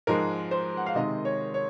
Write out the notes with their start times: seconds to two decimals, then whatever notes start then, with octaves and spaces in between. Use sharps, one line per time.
0.07 G#2 F3 G#3 A#4
0.51 C5
0.77 F#5
0.86 F5
0.95 C3 D#3 G#3 D#5
1.25 C#5
1.54 C#5